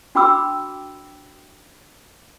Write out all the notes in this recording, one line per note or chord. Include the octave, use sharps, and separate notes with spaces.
D4 F#4 G5 B5 D6 E6